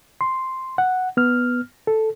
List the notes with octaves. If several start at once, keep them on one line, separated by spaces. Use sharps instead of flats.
C6
F#5
B3 F6
A4